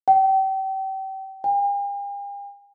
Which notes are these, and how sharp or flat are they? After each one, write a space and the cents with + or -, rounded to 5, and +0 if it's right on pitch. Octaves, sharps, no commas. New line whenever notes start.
G5 -35
G5 +45